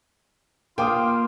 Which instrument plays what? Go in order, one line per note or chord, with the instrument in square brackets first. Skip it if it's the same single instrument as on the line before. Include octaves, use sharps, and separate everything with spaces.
[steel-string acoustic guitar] A#3 [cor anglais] F4 [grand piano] G5 D6 D#6